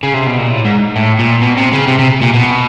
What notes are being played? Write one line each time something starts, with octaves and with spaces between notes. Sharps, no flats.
C#3
C3
B2
A#2
A2
G#2
A2
A#2
B2
C3
C#3
C3
C3
A#2
B2